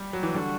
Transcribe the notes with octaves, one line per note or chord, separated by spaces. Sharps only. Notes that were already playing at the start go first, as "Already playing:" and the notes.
Already playing: G3
F#3
E3
D3 G3 D4 F#4